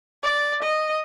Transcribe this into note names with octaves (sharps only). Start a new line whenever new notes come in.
D5
D#5